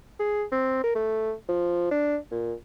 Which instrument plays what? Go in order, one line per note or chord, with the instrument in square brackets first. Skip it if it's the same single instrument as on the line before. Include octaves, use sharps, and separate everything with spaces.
[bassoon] G#4
C4
A#4
A3
F3
D4
A#2